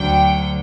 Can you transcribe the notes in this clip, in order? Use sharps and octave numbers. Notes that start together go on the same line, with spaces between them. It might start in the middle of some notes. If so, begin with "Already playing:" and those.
Already playing: D2 D3 F#3 G5